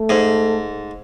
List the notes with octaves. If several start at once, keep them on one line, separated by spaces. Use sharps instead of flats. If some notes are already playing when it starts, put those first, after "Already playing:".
Already playing: A3
G#2